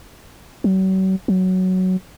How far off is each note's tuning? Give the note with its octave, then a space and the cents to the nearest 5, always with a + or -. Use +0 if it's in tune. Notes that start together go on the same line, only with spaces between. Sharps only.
F#3 +40
F#3 +5